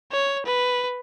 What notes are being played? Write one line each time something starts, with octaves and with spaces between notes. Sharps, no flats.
C#5
B4